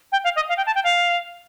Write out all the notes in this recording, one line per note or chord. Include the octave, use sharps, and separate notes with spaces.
G5
F5
D#5
F5
G5
A5
G5
F5